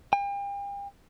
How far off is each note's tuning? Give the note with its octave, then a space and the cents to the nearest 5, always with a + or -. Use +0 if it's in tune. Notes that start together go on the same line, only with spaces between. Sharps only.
G5 +40